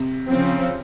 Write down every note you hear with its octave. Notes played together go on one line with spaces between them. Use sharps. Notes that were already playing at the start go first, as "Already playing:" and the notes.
Already playing: C3
C#3 F3 C4